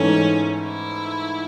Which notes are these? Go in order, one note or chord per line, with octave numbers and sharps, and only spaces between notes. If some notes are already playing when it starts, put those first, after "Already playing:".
Already playing: G#2 E3 A3 C#4
E4